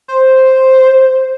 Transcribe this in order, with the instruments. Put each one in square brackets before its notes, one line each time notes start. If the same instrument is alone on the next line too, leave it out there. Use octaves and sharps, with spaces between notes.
[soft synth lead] C5